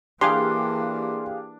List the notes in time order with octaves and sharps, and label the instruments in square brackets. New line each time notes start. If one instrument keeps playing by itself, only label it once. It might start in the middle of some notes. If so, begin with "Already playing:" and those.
[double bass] E3 A#3 [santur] D4 [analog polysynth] G4 G#4 F5 [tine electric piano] C6